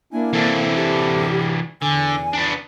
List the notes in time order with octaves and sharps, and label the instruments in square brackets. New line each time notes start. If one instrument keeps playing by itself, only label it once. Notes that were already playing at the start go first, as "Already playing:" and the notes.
[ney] A#3 [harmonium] D4 E4 G#5
[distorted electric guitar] E3 D4 [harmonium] C4 E4 A4
[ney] G4
[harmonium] E2 [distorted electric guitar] D3 [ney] G#5
[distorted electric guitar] B3 D4